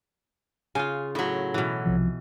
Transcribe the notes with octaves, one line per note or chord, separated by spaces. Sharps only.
C#3 F4 G#5
A2 F#3
B2 E3
C2 C3 F3